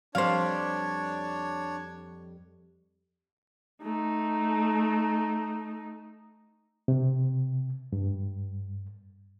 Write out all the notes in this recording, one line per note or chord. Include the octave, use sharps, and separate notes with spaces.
F2 G3 D4 C5 C#5 F5
A3 D#4
C3
G2